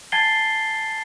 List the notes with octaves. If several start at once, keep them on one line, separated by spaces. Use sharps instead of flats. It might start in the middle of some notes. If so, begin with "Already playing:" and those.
G#5 A5 G#6 A6 C7 G7